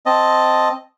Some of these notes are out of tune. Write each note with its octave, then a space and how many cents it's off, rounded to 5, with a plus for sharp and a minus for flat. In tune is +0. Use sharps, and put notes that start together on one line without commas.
C4 +0 D#5 +0 A5 +0